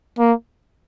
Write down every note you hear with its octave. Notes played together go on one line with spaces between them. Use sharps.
A#3